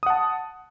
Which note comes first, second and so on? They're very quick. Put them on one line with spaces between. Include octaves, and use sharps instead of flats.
D#6 F#5 A5